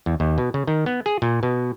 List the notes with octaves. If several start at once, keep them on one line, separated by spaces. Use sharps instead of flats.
E2
D#2
B2
C#3
D#3
B3
G#4
A#2
B2